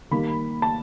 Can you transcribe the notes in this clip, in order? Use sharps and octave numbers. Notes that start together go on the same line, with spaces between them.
D#3 G3 A#3 B5
A5